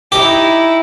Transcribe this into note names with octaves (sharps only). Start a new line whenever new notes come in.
D#4 E4 G4